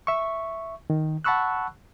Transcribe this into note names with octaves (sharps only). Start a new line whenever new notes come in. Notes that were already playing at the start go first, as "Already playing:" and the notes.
E5 C#6
D#3
F#5 A5 B5 C#6 E6 F#6